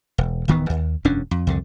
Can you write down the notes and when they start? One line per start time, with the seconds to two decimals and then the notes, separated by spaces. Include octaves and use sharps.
0.18 E1
0.48 D1 D#3 E3 B3
0.69 D#2
1.05 E1 F#2 C#4 D4
1.31 F2
1.47 C2 F2 D3